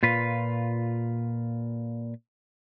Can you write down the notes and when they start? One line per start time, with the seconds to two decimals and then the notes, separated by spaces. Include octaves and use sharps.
0.03 A#2 F4 B4